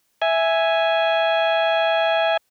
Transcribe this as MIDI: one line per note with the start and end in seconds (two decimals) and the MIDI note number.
0.22 2.37 76
0.22 2.37 80